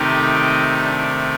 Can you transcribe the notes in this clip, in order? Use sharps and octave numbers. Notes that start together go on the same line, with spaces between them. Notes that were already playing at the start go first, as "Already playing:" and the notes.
Already playing: C3 D#3 A3 C4 D#4 G4
D4